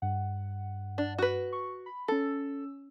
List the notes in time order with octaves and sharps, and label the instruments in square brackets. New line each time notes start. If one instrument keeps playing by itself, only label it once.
[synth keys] G2 F#5
[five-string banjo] D4
F#4 B4
[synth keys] C#6
B5
[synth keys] C#4 E6 [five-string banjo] A4